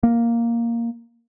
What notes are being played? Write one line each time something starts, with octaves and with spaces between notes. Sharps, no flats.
A#3